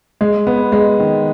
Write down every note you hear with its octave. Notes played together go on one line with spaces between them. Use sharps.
G#3
B3
G#3
D#3